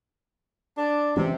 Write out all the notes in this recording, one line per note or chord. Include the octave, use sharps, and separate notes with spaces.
D4
C3 E3 G#3 C#4